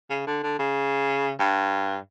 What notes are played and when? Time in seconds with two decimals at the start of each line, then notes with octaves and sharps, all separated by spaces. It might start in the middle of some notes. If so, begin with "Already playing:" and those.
0.10 C#3
0.27 D3
0.43 D3
0.59 C#3
1.39 G2